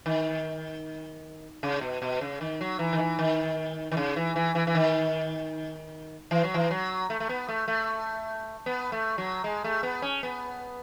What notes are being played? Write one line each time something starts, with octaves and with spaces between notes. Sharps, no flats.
D#3
C#3
B2
B2
C#3
D#3
F#3
E3
D#3
E3
D#3
D#3
C#3
E3
E3
E3
E3
D#3
E3
F#3
E3
F#3
A3
A3
B3
A3
A3
B3
A3
F#3
G#3
A3
B3
C#4
B3